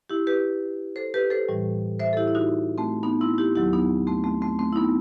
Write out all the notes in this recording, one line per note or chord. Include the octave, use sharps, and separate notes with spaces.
E4 G4
G4 B4
A4 C5
G4 B4
A4 C5
A2 E3 G3
C5 E5
A4
E4 G4
E4
D#4 F#4
A3 C4
B3 D#4
C4 E4
E4 G4
D#2 D#3 F#3 E4 G4
B3 D#4
A3 C4
A3 C4
A3 C4
A3 C4
E4
B3 D#4